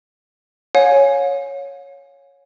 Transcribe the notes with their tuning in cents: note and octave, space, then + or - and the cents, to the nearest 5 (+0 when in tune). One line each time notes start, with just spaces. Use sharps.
C#5 +0 F5 +45 G#5 +0